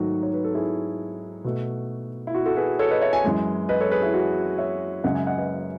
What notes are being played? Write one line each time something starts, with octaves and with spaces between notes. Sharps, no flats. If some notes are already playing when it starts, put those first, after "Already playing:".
Already playing: G#2 D#3 F#3 A3 F#4
C#5
B4
A4
E4 G#4
B2 A3 F#4
E4
F#4
F#4 A4
G#4 B4
A4 C#5
B4 D#5
C#5 E5
E5 G#5
F#2 E3 G#3
B4 D#5
A4 C#5
G#4 B4
E4 G#4
F#4
C#5 E5
F#2 C#3 G#3 D#5 F#5
E5 G#5
D#5 F#5
B4 D#5